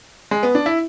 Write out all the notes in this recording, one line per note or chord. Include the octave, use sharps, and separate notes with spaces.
G#3
B3
D4
E4